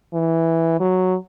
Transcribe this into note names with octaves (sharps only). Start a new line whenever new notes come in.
E3
F#3